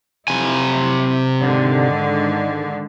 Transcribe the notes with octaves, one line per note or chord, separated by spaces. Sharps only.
C3 F#3 E4 G#5
G#2 D3 D#3